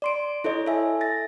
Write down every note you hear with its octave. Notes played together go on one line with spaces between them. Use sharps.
D5 C6 D7
E4 A4 C#5 D#5
A4 E5 G#5
A6 A#6